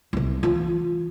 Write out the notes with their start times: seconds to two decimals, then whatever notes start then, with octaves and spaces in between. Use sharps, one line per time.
0.13 C2 C3
0.43 E3 F4